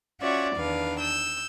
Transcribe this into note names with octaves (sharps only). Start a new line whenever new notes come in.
C#4 F4 F#4 C#5 D5 E5
E2 D#3 D4 B4 F5
E6 G6